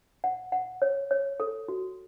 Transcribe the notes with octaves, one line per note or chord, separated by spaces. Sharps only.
F#5
F#5
C#5
C#5
A4
F#4